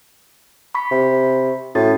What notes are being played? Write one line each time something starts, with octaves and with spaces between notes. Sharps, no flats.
B5 C#6 B6
C3
A2 C#4 F#4 A6